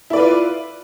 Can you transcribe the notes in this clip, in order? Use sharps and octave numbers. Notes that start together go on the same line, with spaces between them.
E4 F4 B4 D5